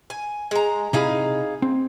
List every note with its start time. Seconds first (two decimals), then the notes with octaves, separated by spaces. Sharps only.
0.10 G#5
0.51 G#3 A#5
0.93 C3 D#4 E4 G#4 F5 B5
1.62 C4